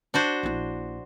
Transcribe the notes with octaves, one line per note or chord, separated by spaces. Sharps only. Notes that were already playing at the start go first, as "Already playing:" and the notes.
D4 F#4 C5
A#1 E4